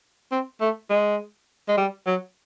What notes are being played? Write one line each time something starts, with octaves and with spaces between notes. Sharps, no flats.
C4
A3
G#3
G#3
G3
F#3